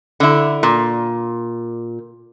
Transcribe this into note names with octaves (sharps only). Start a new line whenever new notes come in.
D3 E4
A#2